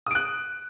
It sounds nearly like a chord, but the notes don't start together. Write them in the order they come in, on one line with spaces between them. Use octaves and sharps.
D#6 D7 F#6